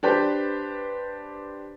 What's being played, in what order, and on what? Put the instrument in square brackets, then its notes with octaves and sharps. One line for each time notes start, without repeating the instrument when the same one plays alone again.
[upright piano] D4 G4 B4 C5